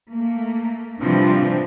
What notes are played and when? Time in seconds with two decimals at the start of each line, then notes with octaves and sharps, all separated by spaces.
0.12 A3 A#3
1.01 C3 E3 F3 G3 C4 D4